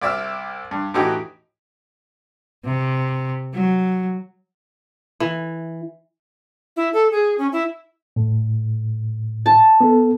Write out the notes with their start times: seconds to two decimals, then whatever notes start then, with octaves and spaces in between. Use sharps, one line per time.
0.02 C2 D5 E5 E6 F6
0.71 G2
0.94 A2 E3 D#4 F#4 G4
2.65 C3
3.54 F#3
5.20 E3
6.76 E4
6.93 A4
7.11 G#4
7.38 C#4
7.52 E4
8.16 A2
9.46 A5
9.81 B3 A4